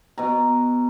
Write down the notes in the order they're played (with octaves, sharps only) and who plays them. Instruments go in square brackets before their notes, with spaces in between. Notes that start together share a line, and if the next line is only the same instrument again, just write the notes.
[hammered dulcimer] B2 A#5